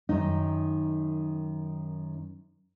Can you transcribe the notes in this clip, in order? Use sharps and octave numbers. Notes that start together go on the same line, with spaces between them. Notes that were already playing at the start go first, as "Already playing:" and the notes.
F#2 D#3 D#4